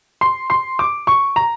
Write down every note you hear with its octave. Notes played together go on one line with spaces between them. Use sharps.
C6
C6
D6
C#6
A#5